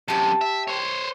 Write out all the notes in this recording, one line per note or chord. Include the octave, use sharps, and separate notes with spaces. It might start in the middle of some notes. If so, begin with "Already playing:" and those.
F#2 C3 G4 A5
E5
C5 C#5